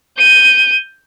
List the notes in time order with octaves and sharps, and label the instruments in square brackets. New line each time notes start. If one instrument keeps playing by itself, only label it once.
[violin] G6 D#7